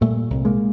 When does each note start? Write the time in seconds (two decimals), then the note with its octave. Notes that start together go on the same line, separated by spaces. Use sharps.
0.01 A#2 G3 A3
0.30 C2
0.45 G#3 A#3